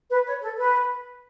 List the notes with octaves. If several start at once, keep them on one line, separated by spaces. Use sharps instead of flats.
B4
C#5
A4
B4